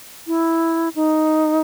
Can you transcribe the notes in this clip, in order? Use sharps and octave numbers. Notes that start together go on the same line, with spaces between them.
E4
D#4